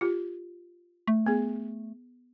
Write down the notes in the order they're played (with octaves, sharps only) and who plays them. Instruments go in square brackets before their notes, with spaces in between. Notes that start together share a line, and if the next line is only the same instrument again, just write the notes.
[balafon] F4 G4
[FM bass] A3
[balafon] B3 G#4